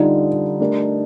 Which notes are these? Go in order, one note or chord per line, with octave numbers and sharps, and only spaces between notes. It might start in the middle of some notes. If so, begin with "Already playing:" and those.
Already playing: D3 G3 D4 D#4 F4
A3 D4 G4 A#4